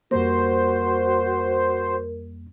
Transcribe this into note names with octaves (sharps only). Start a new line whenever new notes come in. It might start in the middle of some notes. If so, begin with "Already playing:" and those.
F2 G3 A#3 F#4 A#4 C5